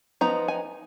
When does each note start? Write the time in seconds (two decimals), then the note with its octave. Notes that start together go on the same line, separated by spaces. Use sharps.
0.21 F3 B3 D#4 A#5
0.48 G#5